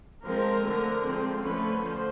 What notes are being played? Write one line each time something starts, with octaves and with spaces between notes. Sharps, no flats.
F3 G#3 C4 A#4
D3 F3 A3
D3 F3 G#3 C4
D3 F3 A3 C#4 B4
D3 F3 C5